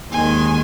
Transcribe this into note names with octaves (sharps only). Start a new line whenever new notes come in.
D#2 D#3 G#3 G#5 C6